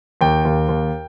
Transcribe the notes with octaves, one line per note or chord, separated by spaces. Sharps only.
D#2 G5
D#2
D#2